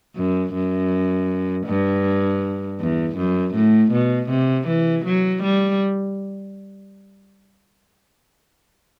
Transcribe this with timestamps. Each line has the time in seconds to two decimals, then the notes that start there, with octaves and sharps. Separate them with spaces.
0.16 F#2
0.54 F#2
1.66 G2
2.80 E2
3.17 F#2
3.55 A2
3.92 B2
4.30 C3
4.68 E3
5.05 F#3
5.43 G3